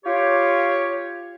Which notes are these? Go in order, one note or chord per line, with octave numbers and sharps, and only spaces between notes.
F4 G4 C#5